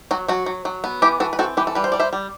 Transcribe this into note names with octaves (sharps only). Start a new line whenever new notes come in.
F#3 F#4
F#3 F#4
F#3
F#3
B3
E3 E4 G4
E3 F#4 A4
B4
C4 F#4 A4
E3 G4 B4
A4
G3 B4
C5
G3 D5
C5 E5
G3